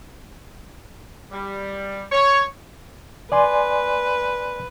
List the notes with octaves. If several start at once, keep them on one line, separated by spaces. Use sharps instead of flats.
G3
C#5
B4 D5 G#5 C6